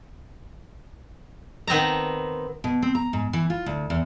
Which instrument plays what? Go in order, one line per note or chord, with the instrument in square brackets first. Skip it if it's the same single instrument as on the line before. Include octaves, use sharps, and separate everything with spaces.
[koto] D#3 B3 C4 A5 A#5
[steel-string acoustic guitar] B2
C4
A#5
G#2
E3
F4
D2
E2